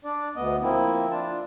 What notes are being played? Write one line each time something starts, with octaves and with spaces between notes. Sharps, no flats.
D4 D5
D2 B3 D#5
F3 A#3 C4 E4
D4 F4 A5